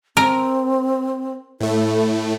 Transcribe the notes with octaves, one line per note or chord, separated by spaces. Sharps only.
C4 A#4
A2 A3 E4